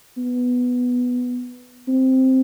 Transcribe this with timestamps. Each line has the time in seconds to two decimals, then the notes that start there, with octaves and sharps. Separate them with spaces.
0.17 B3
1.88 C4